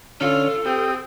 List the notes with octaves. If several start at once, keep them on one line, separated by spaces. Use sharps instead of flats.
D3 C#4 F4 A4 F6
C4 G4 G5 D#6